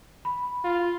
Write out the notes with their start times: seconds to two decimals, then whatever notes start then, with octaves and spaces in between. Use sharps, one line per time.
0.25 B5
0.64 F4